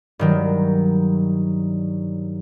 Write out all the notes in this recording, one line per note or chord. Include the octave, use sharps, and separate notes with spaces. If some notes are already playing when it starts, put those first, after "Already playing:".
G2 D#3 F#3